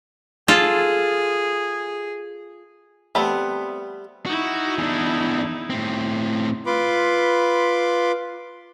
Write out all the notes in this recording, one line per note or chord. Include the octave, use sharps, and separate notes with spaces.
F4 G#4 A4
G3 A3 B3 C4
D#4 E4 F#4
E2 D4
A2 C4
F4 B4 B5 C6 D6